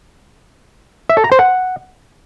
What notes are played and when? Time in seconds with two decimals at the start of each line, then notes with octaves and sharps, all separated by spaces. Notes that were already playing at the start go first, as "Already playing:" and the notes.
1.10 E5
1.17 A4
1.24 A#5
1.32 C5
1.39 F#5